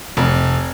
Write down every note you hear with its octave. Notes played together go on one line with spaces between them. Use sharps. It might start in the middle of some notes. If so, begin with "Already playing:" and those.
F1